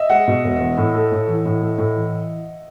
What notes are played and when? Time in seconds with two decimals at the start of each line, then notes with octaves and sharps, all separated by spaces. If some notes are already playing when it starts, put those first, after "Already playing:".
Already playing: D#5 E5
0.10 G#3 F#5
0.28 B2
0.44 E1
0.60 E2
0.78 A2
0.95 A3
1.12 A2
1.28 E3
1.46 A2
1.61 A3
1.78 A2
1.95 E3